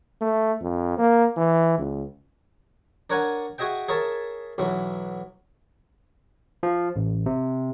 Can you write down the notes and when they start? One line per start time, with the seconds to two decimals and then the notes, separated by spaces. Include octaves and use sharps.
0.21 A3
0.61 F2
0.98 A#3
1.37 E3
1.78 C#2
3.10 D4 A#4 C#5 F#5 G#5 A#5
3.58 F#4 G#4 D#5 E5 G5
3.88 G#4 A#4 C#5 E5 A5
4.58 B1 E3 F#3
6.63 F3
6.96 A1
7.26 C3